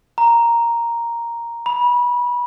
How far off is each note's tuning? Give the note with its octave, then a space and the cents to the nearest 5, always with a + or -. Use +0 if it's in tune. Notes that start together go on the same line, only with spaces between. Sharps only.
A#5 +0
B5 -25